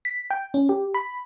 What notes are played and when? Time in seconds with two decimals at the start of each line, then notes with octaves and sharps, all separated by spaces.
0.05 B6
0.30 G5
0.54 C#4
0.69 G4
0.94 B5